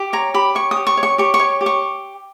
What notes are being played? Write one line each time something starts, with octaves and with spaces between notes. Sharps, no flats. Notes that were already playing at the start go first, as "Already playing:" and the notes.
Already playing: G4
C#5 A#5
G4 B5
C#5 C#6
D#6
G4
C#6
C#5
C#6
G4 C#6
C#6
C#5
G4
C#6